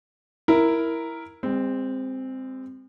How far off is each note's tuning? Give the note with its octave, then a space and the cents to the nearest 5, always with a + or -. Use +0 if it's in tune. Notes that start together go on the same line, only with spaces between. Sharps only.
E4 +0 A#4 +0
G#3 -45 C4 -5